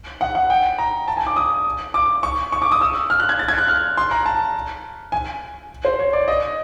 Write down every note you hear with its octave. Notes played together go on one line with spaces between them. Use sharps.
F#5
F#5
G5
A#5
A5
G#5
D6
D#6
D6
C#6
C#6
D6
D#6
E6
F6
F#6
G#6
A6
G#6
F#6
F6
C6
A#5
A5
G#5
C5
C#5
D5
D#5